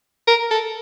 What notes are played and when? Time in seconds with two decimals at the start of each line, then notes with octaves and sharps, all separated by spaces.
0.27 A#4
0.51 A4